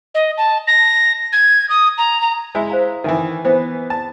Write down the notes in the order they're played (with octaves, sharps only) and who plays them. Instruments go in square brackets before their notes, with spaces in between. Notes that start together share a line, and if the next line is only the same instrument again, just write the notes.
[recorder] D#5
A5
A#6
G#6
D#6
A#5
A#5
[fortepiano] G#3 E4
[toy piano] C5 F5 A#5
[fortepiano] D#3 E3 [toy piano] E5 G#5
[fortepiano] E3 B3 [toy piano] C5
[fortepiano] A5